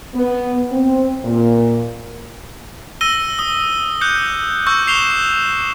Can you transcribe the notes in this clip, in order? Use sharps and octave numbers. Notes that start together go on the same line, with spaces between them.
B3
C4
A#2
E6 A#6 D#7 G7
D#6 G7
D6 F#6 G6 C#7
C#6 E6 F#6 G6
C7 E7 F7 G7